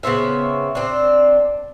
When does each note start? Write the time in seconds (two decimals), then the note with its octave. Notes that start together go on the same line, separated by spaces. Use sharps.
0.03 C#3 B3 C4 E5
0.75 C4 D4